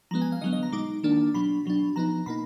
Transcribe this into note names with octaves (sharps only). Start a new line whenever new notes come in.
F3 G#3 B3 A#5
G#5
F5
D3 F#3 B3 D#5
D#5
A#5
B2 G#3 D#4 D6
D#3 A#3 D4
B2 F#3 D4 B5
B2 F#3 D4
F3 B3 D#4 A#5
B2 A#3 D#4 B5